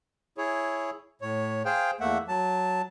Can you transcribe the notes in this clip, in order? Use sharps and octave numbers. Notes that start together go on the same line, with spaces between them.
E4 G#4 C#5
A2 C#5
G#4 C5 F5 G5
E2 A3 A#3 E5 F#5
F#3 A5